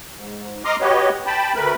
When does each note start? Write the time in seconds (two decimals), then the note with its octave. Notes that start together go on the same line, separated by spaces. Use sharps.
0.15 G#2
0.65 D#5 A#5 C6 D6 D#6 F6
0.81 F#4 G4 B4 C#5 D#5
1.26 G5 A5 B5
1.55 D2 A3 A#4 B4 B5